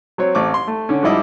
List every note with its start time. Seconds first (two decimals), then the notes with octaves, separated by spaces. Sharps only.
0.18 F#3 C4 C#5
0.35 A1 A3 C4 C#6 D6
0.54 C6
0.68 A3
0.89 D3 C#4
1.03 G#2 F3 G3 E4 D#5 D6